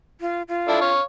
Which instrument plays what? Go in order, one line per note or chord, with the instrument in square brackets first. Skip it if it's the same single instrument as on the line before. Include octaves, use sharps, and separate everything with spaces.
[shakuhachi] F4
F4
[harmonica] D4 E4 A4
C#5 F5